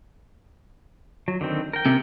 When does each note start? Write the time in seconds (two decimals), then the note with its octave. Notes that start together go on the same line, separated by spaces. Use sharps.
1.28 F#3
1.41 D3 D#3 C4
1.73 A#4 G5
1.86 C3